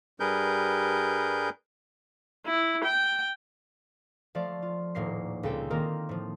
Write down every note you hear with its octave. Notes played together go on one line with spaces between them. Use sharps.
G2 G3 G#4 A#4 B4 G6
E4
G5
F3 A3 D5 F5
F4
D#1 A2 A#3 C7
C#2 A#2 C4 A4 G5
D#3 A#3 C4 F4 A#4
A2 F3